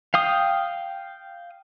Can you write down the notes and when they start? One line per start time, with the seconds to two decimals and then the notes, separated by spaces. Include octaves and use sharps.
0.14 F5 G5 D#6